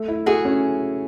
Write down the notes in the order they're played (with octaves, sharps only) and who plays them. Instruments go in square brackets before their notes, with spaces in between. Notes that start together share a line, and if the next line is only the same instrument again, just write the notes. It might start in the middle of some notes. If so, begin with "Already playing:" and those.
Already playing: [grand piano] A3
E4
[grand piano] A3 [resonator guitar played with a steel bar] F#4 G#4
[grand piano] C#4